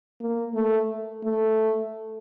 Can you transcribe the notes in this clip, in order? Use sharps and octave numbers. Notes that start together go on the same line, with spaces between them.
A#3
A3
A3